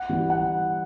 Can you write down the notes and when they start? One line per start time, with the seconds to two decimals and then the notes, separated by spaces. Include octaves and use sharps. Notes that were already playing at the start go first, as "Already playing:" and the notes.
Already playing: F#5
0.09 E3 G3
0.30 F#5